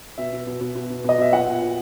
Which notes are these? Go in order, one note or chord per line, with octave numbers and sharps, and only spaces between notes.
B2 E5
B2
B2
B2
B2
B2
B2 D#5
B2 E5
A#2 F#5
A#2
A#2